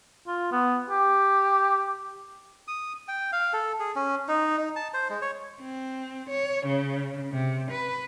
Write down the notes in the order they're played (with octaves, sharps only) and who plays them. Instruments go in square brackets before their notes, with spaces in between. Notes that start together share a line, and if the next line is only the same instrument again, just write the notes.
[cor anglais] F4
B3
G4
[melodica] D#6
G5
F5
A4
G#4
C#4
D#4
D#4
A5
C5
G#3
C#5
[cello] C4
C#5
C#3
C3
B4